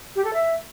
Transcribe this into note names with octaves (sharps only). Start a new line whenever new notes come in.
G4
A4
E5